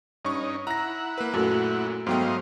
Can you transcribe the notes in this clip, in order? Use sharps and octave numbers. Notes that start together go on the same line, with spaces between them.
G2 C#4 D#4 C#6
E4 F#5 A#5 A#6
A#3 B4
F#2 A#2 A3 F#4 A4
G#2 F#3 A3 B3 C5 D#5 F5 G5